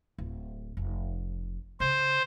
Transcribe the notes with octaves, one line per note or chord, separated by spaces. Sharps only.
D1
F1
C#3 C5